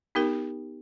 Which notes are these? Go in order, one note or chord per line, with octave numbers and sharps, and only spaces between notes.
B3 D#4 G4 A#4